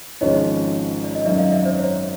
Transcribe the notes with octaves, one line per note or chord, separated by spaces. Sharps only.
G#1 G#2 F3 G#3 C#4 C#5 D#5
D5
D#5
F#2 D#3 F#3 D5 E5
D#5 F5
D5 E5
C5 D5
C#5